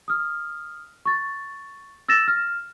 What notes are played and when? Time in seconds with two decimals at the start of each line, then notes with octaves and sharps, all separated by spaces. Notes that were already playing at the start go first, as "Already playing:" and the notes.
0.08 D#6 F6
1.05 C#6 A6
2.08 E6 A6 A#6 E7
2.28 F6